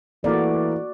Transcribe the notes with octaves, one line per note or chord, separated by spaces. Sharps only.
E3 A3 A#3 F#4 D5